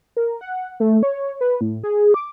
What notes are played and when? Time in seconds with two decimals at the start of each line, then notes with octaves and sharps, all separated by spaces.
0.17 A#4
0.41 F#5
0.80 A3
1.03 C#5
1.41 B4
1.61 A2
1.84 G#4
2.14 D6